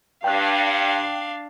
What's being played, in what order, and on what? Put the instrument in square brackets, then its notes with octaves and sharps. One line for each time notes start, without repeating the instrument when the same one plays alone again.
[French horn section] G2 [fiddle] D4 F5 [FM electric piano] G5 F#6